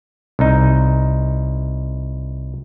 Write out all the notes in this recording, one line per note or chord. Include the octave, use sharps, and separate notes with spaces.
C2 D#4